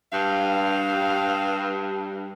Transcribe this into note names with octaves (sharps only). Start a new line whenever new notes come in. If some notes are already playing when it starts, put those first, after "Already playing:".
G2 F5